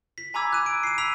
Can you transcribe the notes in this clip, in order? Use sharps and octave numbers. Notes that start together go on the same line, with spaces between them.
B6
G#5 A#5 B5 D6 E6 G#6
F#6 D#7
D7
C7 D#7
B5 E6 B6 D#7 F7